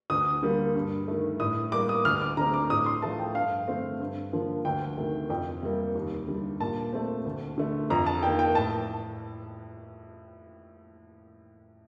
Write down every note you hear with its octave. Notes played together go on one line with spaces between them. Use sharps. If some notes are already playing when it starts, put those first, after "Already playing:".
D2 D#6
D3 G3 A#3
G2
D#3 A3
A2 D#6
G3 A#3 D6
D#6
D2 F6
D6
D3 A3 C4 A#5
D6
A2 D#6
C6
F3 A3 A5
G5
G2 F5
D3 A3 C4
G2
D3 F3 A#3
D2 G5
C3 D#3 A3
F2 G5
C3 G3 A#3
D#2
D3 G3
A#2 A5
A3 C4
D2
D3 A3
F2 A#5
A5
D#3 A#3 G5
G5
A2 A5